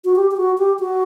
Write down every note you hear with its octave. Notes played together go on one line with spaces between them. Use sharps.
F#4
G4
G4
F#4
G4
F#4